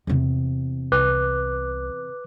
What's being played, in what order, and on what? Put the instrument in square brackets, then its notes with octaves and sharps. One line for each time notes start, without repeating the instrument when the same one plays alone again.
[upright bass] E2 C3
[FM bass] C2 [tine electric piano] B4 D6 F#6